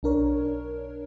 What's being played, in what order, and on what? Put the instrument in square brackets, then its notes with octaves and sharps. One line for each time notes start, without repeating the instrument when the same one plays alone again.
[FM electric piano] B1 D4 A#4 C#5